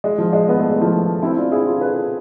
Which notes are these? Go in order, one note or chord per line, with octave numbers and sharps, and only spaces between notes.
G#3
F3
G#3
B3
A3
G#3
F3 A3
C4 E4
D4 F4
E4 G#4
F4 A4
G#4 B4